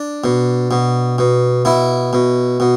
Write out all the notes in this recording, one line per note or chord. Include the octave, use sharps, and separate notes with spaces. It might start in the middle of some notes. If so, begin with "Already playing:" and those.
Already playing: D4
B2
B2
B2
B2 E4
B2
B2